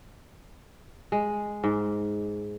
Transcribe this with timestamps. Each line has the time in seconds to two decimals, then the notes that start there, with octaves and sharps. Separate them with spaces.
1.12 G#3
1.64 G#2